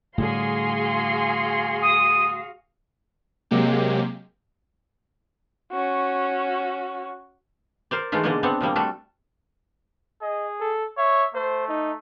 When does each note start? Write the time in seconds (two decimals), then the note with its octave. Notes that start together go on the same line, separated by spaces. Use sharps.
0.18 A2 D3 G3 F#4 G#4 F5 C6
1.82 D#6
3.51 C3 F#3 G#3 A#3 G4
5.72 C#4 F#4
7.91 A#4 C5 D5
8.12 E3 G#3 A3 D#4 F4
8.23 B2 D3 G#3 A#3 D5 D#5
8.43 B3 C4 D4 F#5
8.61 A#2 F3 G3 A#3
8.76 G3 A3 F#4 A4
10.22 G#4 D#5
10.60 A4
10.98 C#5 E5
11.35 A3 C5
11.68 D#4